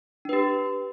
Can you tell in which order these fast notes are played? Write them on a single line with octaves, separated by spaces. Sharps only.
D4 B4 G4